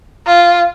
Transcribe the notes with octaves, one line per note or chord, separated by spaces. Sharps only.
F4